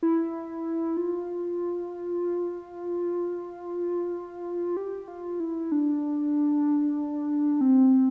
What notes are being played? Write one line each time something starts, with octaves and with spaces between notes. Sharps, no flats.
E4
F4
G4
F4
E4
D4
C4